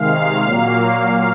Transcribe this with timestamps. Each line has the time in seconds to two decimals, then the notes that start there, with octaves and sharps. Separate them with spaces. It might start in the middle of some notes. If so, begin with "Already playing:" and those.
Already playing: C3 D#3 G#3 F5
0.43 A#2 F#3 A#3